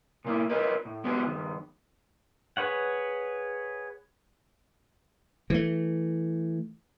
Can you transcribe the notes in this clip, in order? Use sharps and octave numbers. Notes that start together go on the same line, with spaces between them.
A#2 A#3 E4
F4 A#4 B4 C#5 D#5
A2
G#3 B3 C#4 F#4 G4
G2 D#3
G#4 B4 C#5 F#5
E3 A3